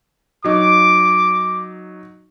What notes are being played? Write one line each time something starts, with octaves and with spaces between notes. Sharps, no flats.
F#3 D#4 D6